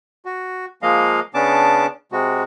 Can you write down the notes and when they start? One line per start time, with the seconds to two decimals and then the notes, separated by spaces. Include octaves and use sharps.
0.25 F#4
0.82 F3 G#3 A#3 D#5 F5
1.34 C#3 B3 C#4 D4 A5 D6
2.12 C3 G#3 F#4